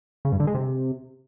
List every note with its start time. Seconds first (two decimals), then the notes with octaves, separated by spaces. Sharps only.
0.25 C#3
0.32 G2
0.40 D3
0.47 G#3
0.55 C3